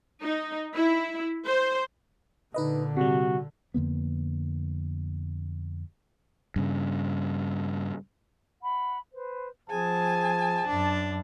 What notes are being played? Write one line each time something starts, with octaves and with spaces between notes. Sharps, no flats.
D#4
E4
C5
A#2 D3 D#4 B4 D#5
C3 G3 F#4
F2 D3 A#3 B3
G2 C#3
F#5 B5
B4 C5
F3 C4 G#4 G#5 A5
F#2 D4 D6